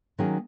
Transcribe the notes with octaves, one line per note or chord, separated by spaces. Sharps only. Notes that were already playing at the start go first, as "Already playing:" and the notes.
D#3 F#3 A#3 C#4 G#4